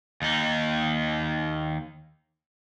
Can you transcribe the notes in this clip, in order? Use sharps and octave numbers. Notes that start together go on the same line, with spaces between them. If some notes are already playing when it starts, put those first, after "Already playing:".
D#2 D#4